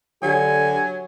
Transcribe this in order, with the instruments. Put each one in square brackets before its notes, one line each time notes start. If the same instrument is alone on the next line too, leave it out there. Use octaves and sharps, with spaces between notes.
[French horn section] D3 G4 [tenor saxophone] F#3 [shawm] G#5